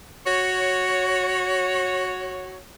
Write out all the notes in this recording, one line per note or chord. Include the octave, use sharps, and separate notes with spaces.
F#4 C#5